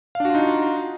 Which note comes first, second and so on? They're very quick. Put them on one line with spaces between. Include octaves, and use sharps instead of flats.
F5 D4 F#4 F4 D#4